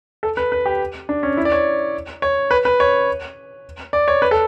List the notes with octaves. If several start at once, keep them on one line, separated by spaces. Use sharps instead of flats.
A4
B4
B4
G4
D4
C#4
E4
D5
C#5
C#5
B4
B4
C#5
D5
C#5
B4
A4